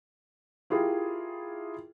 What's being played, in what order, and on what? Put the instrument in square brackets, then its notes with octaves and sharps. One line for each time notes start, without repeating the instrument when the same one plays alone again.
[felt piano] E4 F4 G4 G#4 A#4